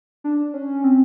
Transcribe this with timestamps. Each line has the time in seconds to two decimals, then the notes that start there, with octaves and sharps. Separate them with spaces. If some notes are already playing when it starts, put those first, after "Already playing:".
0.24 D4
0.54 C#4
0.84 C4